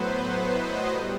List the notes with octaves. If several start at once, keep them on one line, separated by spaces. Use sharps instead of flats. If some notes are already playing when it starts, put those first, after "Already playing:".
Already playing: A2 F#3 B3 B4 C5
D#5
G3